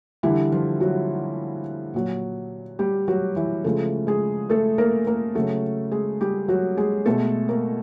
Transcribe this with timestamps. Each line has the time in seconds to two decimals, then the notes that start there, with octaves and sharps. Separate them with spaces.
0.23 D3 E3 G3 E4
0.52 F3 F4
0.80 F#3 F#4
1.94 A#2 F#3
2.79 G3 G4
3.08 F#3 F#4
3.36 E3 E4
3.64 C#3 F3 G#3 A3 A4
4.07 G#3 G#4
4.49 A3 A4
4.78 A#3 A#4
5.07 A#3 A#4
5.35 C#3 F#3 A3 A4
5.92 G#3 G#4
6.21 G3 G4
6.48 F#3 F#4
6.77 G#3 G#4
7.06 B2 G#3 A3 A4
7.48 A#3 A#4